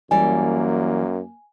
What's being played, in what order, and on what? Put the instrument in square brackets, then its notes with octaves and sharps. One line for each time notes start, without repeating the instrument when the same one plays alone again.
[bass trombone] F#2 [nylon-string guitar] E3 G3 D5 [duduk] A#3 [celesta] G#5